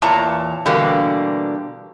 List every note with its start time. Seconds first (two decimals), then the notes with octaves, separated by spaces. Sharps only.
0.02 E2 A#2 E3 C#5 A5 A#5
0.66 B2 D3 E3 G3 A#3